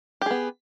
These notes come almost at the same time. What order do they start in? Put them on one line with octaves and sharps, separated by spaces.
G4 G#4 B3